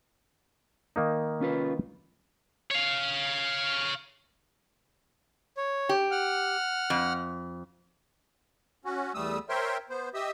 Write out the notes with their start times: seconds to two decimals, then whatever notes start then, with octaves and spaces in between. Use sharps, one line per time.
0.96 D#3 A#3 D#4
1.41 C#4 F4 B4
2.72 C#5 F5
5.57 C#5
5.89 G4
6.11 F#5 F6
6.90 F2
8.85 C#4 F#4
9.14 E2 G3 A3 D#6 E6
9.49 A#4 C5 C#5 E5 G5 C6
9.89 B3 C5
10.14 G4 D#5 E5 D#6 E6